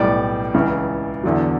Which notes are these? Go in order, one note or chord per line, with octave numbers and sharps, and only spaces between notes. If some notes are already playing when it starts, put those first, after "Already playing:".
Already playing: B1 A2 G3 D5
C#2 C#3 E3
E2 D3 F#3